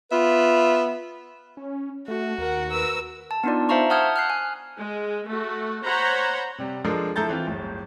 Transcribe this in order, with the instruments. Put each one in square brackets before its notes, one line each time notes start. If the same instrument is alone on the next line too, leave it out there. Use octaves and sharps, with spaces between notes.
[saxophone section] B3 F4 B4 E5
[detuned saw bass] C#4
[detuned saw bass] A3 [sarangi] F#4
[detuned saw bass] D#2 [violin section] A#4 F#5
[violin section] A#4 B4 E6
[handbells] A5
B3 D4 D#4 F4 D5
C5 E5 F5 A5 A#5 C#6
F#5 A5 D#6 F6 G6 G#6
F6 F#6 C7
G#5
[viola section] G#3
A3 F#4
C5 C#5 F#5 A#5 B5
[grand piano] C3 G3
F3 G#3 D4 A4 A#4
F3 E4 A4 A#5 G6 A6
E3 C4 E4 F4
D1 G1